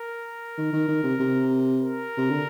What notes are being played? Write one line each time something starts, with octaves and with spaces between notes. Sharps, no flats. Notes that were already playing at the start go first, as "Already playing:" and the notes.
Already playing: A#4
D#3
D#3
D#3
C3
C3
A#4
C3
D3